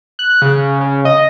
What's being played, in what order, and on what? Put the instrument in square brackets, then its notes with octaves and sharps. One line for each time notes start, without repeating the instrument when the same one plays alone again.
[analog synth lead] F#6
C#3
C#3
D#5